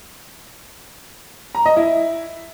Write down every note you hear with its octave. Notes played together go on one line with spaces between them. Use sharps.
A#5
D#5
E4